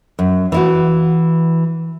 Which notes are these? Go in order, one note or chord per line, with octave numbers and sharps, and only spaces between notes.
F#2
E3 E4 F#4